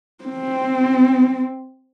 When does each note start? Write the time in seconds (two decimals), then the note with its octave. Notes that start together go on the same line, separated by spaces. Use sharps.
0.25 C4